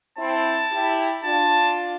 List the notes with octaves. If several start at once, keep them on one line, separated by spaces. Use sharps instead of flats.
C4 E4 A5
E4 G4
D4 F4 A5